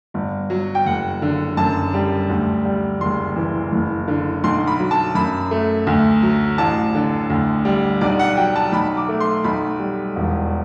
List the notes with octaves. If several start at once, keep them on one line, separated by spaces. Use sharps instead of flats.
G1
F#3
G5
F#1 F#5
D3
F#2 A5
G3
D2
G3
F#1 C6
E3
F#1
D3
B1 C6
B5
F#3
A5
F#2 B5
A3
D2
F#3
A1 A5
D3
D2
G3
B1 D5
F#5
F#3 G5
A5
B1 B5
D6
A3
C6
B1 B5
G3
E1